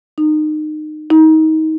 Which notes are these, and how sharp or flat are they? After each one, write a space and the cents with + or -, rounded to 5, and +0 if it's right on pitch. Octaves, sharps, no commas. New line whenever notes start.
D#4 -25
D#4 +25